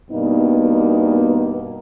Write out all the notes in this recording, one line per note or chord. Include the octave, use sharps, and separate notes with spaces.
G2 B2 A#3 B3 D#4